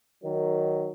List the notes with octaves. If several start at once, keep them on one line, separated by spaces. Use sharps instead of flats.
D#3 F#3